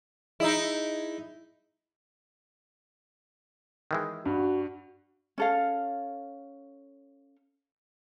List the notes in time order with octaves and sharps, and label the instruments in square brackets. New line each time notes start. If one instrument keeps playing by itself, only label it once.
[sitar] D#4 E4 [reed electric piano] G#4 D#5
[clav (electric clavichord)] D#3 E3 G#3
[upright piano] G2 [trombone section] F#4
[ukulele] C#4 A4 F5